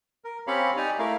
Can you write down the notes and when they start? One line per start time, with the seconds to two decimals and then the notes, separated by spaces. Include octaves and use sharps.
0.25 A#4
0.47 C4 C#4 G4 C#5 F5 B5
0.77 D#4 G4 D5 G#5 A#5
0.99 A3 E4 A#4 F5